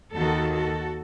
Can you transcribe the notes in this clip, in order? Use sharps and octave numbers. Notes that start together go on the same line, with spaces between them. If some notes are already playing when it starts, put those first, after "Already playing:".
D#2 D#3 F#4 A4
F#4 A4